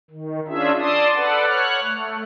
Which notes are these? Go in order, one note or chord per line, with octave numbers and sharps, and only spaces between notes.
D#3
C#4 D4 F4 G#4 E5
D5 A5 C6 D#6
A4 B4 D5 F#5
C#5 F#5 F6 F#6
A3